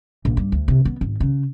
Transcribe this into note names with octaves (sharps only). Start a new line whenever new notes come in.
A#1
G2
D2
C3
B3
G#1
C#3